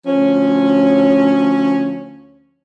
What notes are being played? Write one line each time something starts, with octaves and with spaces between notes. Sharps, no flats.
D2 F3 C#4